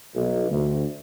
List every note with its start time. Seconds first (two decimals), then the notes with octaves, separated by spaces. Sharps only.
0.15 B1
0.50 D2